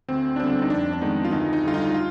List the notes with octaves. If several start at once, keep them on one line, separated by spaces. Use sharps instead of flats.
D2 C4
D4
D3 G3 B3 C4
D#4
F2 D4
D4
D#3 G#3 B3 D#4
F4
D2 D#4
D#4
D3 G3 F4
D#4
F4